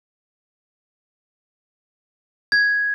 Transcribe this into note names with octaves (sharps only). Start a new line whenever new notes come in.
G#6